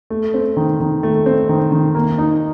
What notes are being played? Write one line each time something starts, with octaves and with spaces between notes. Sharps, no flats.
A3
C4
D#3
D#3
A3
C4
D#3
D#3
A#3
D#4